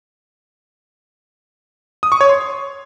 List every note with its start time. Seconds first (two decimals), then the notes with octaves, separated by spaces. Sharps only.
2.03 D#6
2.12 C#6
2.21 C#5
2.29 C6